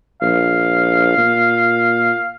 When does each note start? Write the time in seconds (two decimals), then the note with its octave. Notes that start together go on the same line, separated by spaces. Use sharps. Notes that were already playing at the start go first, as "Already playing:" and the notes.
0.22 A#1 F5
1.17 A#2